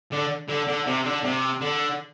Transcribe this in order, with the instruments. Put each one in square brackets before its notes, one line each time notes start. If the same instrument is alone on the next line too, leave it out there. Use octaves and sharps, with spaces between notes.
[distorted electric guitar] D3
D3
D3
C3
D3
C3
D3